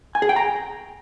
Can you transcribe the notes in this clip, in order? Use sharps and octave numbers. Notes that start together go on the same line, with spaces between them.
G#5
G#4
G5
A#5